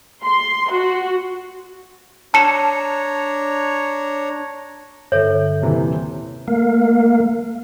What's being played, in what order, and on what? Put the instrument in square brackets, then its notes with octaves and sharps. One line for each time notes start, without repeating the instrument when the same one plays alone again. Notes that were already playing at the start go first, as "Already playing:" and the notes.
[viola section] C6
F#4
[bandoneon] D4 C#5 A#5 [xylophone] A5 C#7 E7
[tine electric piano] G2 D3 [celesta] A4 E5 [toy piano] C#5
[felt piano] D#1 C3 E3
[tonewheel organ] A3 A#3 A#4 F5